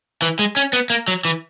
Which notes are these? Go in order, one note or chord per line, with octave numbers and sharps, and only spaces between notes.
E3
G#3
C#4
B3
A#3
F#3
E3